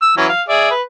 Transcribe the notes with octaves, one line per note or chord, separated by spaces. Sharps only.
E6
E3 F#3 C#4
F5
G#4 D5 E5
B4